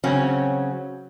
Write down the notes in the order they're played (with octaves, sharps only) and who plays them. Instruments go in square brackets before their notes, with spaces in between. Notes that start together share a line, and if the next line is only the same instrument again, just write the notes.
[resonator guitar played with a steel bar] C#3 F#3 C4 C#4